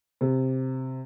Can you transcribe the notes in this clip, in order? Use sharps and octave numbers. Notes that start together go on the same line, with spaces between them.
C3